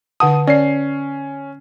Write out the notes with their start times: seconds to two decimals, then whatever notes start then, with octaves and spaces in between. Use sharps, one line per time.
0.20 D3 F#5 A5 D#6
0.47 C#4 D5 C7